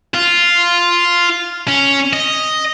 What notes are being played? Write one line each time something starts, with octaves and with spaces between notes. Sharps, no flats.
F4
C#4
D#5